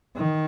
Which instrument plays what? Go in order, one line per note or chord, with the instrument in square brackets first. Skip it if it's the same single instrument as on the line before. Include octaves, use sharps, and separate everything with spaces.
[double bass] D#3